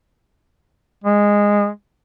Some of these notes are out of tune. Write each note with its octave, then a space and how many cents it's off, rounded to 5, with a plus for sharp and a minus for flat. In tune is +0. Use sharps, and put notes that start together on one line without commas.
G#3 -15